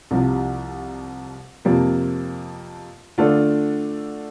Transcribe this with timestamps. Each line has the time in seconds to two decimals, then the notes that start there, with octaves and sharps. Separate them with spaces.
0.11 C2 C3 F3
1.65 F2 C3 F3 A#3
3.18 D3 A3 D4 F4 A4